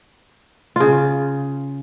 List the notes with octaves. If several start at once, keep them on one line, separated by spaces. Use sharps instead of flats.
C#3 F4